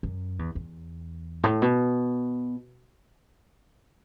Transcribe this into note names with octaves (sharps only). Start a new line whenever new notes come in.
F#2
E2
E2
A2
B2